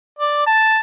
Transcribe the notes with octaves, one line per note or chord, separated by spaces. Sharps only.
D5
A5